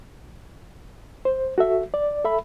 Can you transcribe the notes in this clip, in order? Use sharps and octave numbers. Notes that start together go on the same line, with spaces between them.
C5
F#4 A4 E5
D5
A4 E5 B5